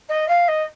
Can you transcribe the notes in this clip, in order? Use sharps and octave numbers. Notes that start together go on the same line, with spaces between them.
D#5
F5
D#5